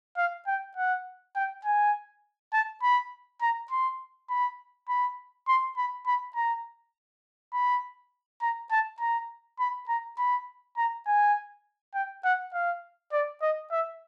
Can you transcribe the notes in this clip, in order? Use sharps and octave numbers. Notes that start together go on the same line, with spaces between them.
F5
G5
F#5
G5
G#5
A5
B5
A#5
C6
B5
B5
C6
B5
B5
A#5
B5
A#5
A5
A#5
B5
A#5
B5
A#5
G#5
G5
F#5
F5
D5
D#5
E5